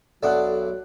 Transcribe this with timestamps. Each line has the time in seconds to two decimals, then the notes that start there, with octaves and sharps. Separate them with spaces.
0.23 B1 F#3 D4 A4 D5 E5 F#5 F#6